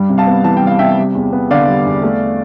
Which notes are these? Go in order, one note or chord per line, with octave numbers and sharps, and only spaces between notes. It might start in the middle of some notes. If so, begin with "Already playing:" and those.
Already playing: G2 G3
C3
F5 A5
B3
E3 A5
G5
G3 F5
C3 E5 G5
G3
E2
B3
D3 D5 F5
G3
E2
A3